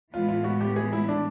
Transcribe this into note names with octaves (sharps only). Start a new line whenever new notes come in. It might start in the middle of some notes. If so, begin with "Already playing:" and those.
A2 E3 G#3 B3 F4
F4
F#4
G4
G#4
E4
D4